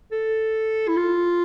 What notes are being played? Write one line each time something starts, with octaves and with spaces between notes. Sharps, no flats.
A4
E4
F4